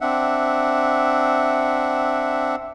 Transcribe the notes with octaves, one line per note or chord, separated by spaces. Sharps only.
C4 D4 E5 F#5